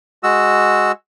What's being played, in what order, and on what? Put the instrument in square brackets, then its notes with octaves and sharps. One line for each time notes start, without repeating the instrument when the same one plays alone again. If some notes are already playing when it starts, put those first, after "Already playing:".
[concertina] G#3 F#4 E6